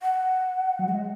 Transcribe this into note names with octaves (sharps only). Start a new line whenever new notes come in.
F#5
F#3
G#3 F#5
D#5